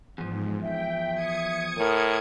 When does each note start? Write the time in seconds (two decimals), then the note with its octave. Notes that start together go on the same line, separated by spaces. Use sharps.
0.18 E2 G#2 F3
0.62 E5 G5
1.13 D#6 G#6 C#7
1.78 A2 A#4